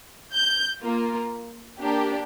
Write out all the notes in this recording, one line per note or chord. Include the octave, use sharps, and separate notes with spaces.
G6
A#3 F4
A#3 D4 G4